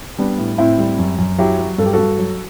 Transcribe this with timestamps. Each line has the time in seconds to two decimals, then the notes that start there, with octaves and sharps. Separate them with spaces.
0.19 G3 B3 D4
0.38 A2
0.58 A2 C4 E4
0.78 G3
0.99 F#2
1.18 F#2
1.38 F#3 E4 G4
1.59 F#3
1.78 G2 A4
1.86 G4
1.93 G2 F#4 A4
2.18 F#3